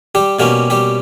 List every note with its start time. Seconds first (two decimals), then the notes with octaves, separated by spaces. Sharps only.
0.15 G3 G4
0.39 B2 G3 A#3 C#4 G4
0.70 G3 G4